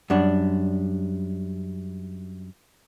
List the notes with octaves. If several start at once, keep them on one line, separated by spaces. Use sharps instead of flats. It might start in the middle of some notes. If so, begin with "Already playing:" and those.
F#2 G3 D4